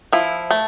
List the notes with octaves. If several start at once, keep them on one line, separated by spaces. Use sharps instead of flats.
F3 E4
A3